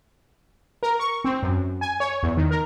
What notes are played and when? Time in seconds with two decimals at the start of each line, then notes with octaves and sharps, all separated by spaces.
0.83 A#4
0.99 C#6
1.24 C4
1.43 F#2
1.81 G#5
2.00 C#5
2.23 E2
2.37 D#3
2.51 A#4